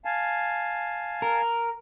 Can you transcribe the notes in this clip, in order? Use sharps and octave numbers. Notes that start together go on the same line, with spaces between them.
F5 G#5 A5
A#4